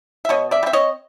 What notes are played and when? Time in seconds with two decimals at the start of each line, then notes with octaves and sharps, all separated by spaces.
0.25 E5
0.29 B2 C#5 D#5
0.51 D5 E5
0.63 G3
0.66 C4 E5
0.73 C#5 D#5